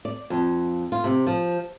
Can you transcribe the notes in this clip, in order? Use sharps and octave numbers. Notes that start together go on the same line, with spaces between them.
D5
F2
F4
C3
F3